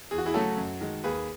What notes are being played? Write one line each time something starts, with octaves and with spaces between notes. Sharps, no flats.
E2 G#4
F#4
E4 G#4
C#3 F#3 A3 C#4 F#4 A4
F#2
D#3 G#3
D#2 G#4 B4